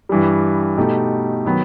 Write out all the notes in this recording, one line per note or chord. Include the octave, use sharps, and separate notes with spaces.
G2 E3 G3
B2 A3 D#4 G4
D#3 F#3 B3